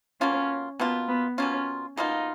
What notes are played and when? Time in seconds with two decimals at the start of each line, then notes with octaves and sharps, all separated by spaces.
0.21 B2 A#3 C#4 F4
0.80 B2 A#3 B3 F4
1.08 B3
1.38 B2 A#3 C#4 F4
1.97 B2 A#3 D#4 F4